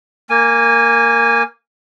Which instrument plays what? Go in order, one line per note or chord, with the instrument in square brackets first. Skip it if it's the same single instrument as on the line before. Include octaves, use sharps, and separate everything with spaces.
[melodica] A#3 G#5